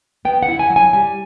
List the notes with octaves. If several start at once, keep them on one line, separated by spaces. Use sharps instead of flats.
B3 G5
F#5
E4
G#5
F#3
G#5
G3 G#5